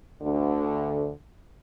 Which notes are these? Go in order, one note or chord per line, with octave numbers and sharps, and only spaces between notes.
D2 D3